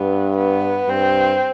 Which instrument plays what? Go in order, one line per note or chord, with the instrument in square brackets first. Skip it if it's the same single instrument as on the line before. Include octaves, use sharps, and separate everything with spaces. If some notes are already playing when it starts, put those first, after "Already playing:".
Already playing: [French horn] G2 [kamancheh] B3
[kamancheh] B3
[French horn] G2 [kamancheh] C4